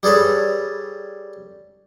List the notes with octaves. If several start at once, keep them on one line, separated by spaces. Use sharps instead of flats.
G3 G#4 A4 B4 C#5